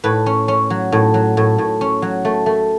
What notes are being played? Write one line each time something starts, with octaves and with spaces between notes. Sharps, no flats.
A2 B4
C#4
C#4
F#3
A2
F#3
A2
A2
C#4
F#3
A3
A3